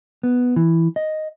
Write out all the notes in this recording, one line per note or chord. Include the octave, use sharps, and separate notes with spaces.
B3
E3
D#5